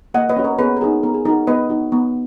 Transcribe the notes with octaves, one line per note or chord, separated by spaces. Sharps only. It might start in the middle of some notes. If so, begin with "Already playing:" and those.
A#3 D#5 F#5
B4 D#5
C#4 F#4
A#4 C#5
B3 G#4 B4
A#4
D#4 F#4 G#4
B3 A#4
G#4
D#4 F#4 A#4
B3 B4 D#5
D#4 F#4
B3